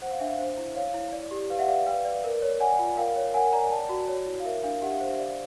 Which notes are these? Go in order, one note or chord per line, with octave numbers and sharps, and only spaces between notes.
C5 F#5
F5
D4 E5
F5
C5
E4
C#5 F5
E4
D5
G4
B4 F5
E5 F#5
D5 F5
B4 F5 G5
D5
A#4
C#5
D5 F#5 G#5
F4
A#4 F5 G5
C#5
A#4 F#5 G#5
D5 G#5 A#5
D5 G5 A5
F#4
C#5
E4
F5
A#4 E5
D4 F5
G4 E5 F#5
F5
C5 E5
E5
D5 F5